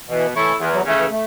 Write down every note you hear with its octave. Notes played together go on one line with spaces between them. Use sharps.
B2 E3
E3 A3 E4 A4 C#5
E2 E3
F#3
C#3 E3 A3
E3
A3